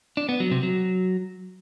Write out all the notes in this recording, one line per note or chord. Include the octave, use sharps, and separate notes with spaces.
D4
B3
F#3
C3
F#3